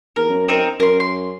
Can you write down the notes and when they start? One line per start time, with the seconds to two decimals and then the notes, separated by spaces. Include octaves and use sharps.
0.16 E2 A#4
0.29 F#2
0.48 C4 D#4 A#4
0.80 F#2 A#4 C6
1.00 C6